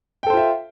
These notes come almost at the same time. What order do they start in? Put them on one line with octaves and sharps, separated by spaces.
G5 A4 C5 F4 E5